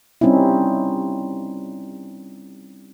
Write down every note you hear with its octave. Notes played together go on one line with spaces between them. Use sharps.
G3 C4 C#4 D#4 E4